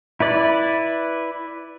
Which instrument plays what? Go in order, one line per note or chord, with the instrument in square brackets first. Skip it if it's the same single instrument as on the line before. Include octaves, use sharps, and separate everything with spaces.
[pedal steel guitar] E4 B4 D5